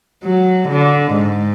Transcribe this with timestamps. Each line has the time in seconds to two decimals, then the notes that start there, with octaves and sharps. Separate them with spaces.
0.24 F#3
0.68 D3
1.13 G#2